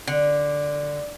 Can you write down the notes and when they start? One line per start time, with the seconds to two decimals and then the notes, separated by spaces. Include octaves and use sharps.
0.07 D3